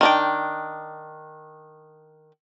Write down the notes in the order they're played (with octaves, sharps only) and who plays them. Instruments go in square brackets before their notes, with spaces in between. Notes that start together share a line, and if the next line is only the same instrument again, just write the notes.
[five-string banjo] D#3 D4 G5